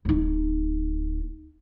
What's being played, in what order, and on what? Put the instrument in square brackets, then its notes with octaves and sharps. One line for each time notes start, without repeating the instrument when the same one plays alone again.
[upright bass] D1 D#4